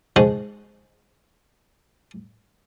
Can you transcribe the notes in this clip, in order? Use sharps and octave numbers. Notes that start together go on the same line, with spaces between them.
F3 G#3 D#4 F#4